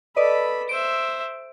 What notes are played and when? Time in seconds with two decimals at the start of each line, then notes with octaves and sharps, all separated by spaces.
0.16 A4 B4 D5 D#5 B5
0.69 C5 E5 D7